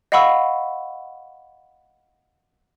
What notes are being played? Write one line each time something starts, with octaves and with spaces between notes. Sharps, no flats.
D#5 F5 F#5 B5 C#6 E6